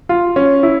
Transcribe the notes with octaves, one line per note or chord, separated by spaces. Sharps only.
F4
C#4
E4